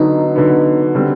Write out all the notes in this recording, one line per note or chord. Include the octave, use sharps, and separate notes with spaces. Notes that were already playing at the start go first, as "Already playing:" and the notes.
Already playing: D3 F#3 B3 D#4
D3 F#3 B3
D3 G3 C4